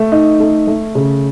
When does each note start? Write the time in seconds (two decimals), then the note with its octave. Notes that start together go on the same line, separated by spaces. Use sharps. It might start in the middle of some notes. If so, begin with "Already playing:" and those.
Already playing: A3
0.12 D#4
0.40 A3
0.67 A3
0.95 C#3